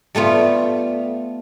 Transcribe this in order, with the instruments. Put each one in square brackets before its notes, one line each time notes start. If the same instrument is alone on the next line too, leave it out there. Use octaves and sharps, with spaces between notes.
[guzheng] G3 A3 B3 F4